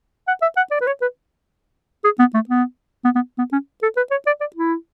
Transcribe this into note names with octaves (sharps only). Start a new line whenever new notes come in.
F#5
E5
F#5
D5
B4
C#5
B4
G#4
B3
A3
B3
B3
B3
B3
C#4
A4
B4
C#5
D5
D5
E4